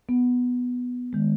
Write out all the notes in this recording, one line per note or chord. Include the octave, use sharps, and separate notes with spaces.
B3
D#3 G#3